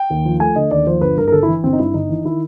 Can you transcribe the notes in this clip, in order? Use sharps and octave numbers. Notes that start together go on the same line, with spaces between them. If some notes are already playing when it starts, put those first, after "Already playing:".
Already playing: G5
D#2
F3
A3 G#5
D3 D#5
D#2 D5
F3 C5
G1 B4
G2 A#4
A#4
G1 A4
E4
E3
G1 C4
D#4
G2 E4
G1 D#4
E3
D#3 E4